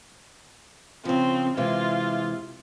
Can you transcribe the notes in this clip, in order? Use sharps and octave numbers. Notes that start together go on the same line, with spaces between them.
C#3 F3 C4
C3 E3 G#3 F4